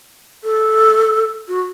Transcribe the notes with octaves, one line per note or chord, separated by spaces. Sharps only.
A4
F#4